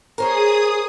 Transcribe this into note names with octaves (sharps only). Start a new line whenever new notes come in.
G#4 A#4 C5 C#5 D#6